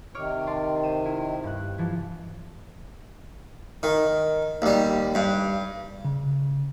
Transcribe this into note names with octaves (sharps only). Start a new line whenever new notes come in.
C3 D#3 C#5 D6 F6
D5 A5 C6
C5 D#7 E7
E4
G2 F#6
E3 F3
D#3
D#2 G3
G2
C#3